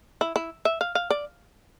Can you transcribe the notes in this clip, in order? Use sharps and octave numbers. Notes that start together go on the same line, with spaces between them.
E4
E4
E5
F5
F5
D5